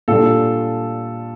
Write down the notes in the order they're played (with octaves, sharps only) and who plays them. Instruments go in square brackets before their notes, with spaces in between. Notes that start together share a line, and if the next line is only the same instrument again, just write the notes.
[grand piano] A#2 G3 D4 F4 A4